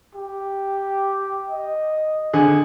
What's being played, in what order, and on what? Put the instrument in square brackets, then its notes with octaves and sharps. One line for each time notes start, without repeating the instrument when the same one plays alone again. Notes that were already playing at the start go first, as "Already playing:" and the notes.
[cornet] G4
D#5
[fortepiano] D3 G#4